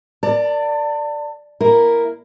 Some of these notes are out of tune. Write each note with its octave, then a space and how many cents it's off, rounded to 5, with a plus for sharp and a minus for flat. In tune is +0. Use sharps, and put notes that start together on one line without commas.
A#4 +0 D5 +0 A5 +35
A#3 +0 E4 +0 A#4 +0